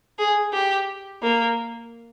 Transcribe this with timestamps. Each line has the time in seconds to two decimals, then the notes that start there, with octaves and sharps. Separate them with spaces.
0.19 G#4
0.53 G4
1.22 A#3